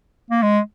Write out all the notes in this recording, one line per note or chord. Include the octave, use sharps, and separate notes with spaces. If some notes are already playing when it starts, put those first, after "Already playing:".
A#3
G#3